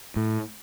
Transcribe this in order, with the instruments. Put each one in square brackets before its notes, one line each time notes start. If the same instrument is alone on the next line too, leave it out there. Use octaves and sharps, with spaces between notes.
[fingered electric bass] A2